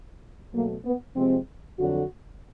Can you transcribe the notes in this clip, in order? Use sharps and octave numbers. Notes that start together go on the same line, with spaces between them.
B2 F#3 A3 A#3
B3
C3 F3 G#3 C4
F2 D3 F#3 F#4